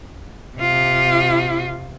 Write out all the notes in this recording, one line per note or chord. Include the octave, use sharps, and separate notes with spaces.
C3 F4